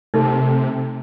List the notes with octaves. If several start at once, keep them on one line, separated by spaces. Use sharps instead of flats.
C3 A3 D#4 A4